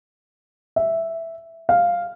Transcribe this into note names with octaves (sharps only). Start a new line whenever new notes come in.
E5
F5